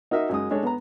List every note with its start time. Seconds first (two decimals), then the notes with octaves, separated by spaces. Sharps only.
0.11 D#4 F#4 A#4 D#5 E5
0.29 F#2 G#3 D#6
0.51 G#3 D4 A4 C#5
0.63 B3 A#5